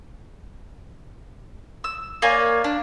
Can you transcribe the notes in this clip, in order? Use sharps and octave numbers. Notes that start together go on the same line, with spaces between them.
E6
A#3 C#5 D5 G#5
D4